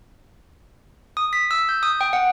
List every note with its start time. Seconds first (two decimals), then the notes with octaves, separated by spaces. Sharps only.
1.17 D#6
1.33 B6
1.51 E6
1.69 G6
1.83 D#6
2.01 G5
2.13 F#5